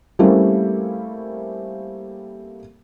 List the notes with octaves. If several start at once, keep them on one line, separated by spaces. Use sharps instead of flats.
G3 A3 A#3 C4 C#4 E4